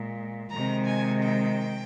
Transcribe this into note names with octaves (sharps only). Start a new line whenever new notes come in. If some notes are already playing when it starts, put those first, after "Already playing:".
Already playing: A#2 G#3
C3 D#3 G#3 A#5
G#5
G5